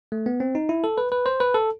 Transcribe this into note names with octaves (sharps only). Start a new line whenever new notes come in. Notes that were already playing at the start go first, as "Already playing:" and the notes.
A3
B3
C4
D#4
E4
A4
B4
B4
C5
B4
A4